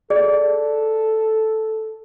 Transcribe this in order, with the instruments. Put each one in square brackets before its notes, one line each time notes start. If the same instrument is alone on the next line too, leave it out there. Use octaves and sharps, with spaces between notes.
[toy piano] G#4 D5 [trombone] A4